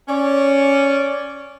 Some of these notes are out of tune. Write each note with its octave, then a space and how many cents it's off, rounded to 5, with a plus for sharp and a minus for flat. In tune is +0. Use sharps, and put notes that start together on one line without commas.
C#4 +0 D5 -15